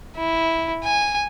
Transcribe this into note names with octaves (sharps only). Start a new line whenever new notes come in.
E4
G#5